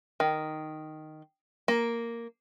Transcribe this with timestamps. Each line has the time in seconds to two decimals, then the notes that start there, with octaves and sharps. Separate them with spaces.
0.20 D#3
1.68 A#3